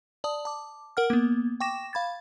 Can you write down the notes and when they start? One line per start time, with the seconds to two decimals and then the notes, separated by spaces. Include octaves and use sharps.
0.24 D5 A5 D#6
0.45 A5 D6
0.97 A#4 F#5 F6
1.10 A#3 B3
1.60 G5 C#6 D6 A#6 E7
1.93 F5 B5 G#6 A6